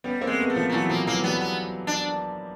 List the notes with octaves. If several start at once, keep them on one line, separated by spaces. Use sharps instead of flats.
G3 B3 C#4
A#3 C4
G#3
A3 B3
A3
F3
A#3
E3 F#3 A3
F3 A#3
E3 F#3 A#3
F3 G3 B3
B3
D4